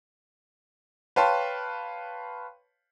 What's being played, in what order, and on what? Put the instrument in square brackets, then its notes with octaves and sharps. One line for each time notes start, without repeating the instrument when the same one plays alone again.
[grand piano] B4 C#5 F5 G5 A5 C6